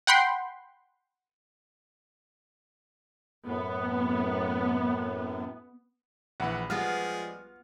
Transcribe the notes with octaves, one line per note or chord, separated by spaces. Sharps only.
F#5 G5 B5 C6
F#2 A2 B3
A#1 E3 F#5 B5
F3 G3 G#3 B3 F4 F#4 F6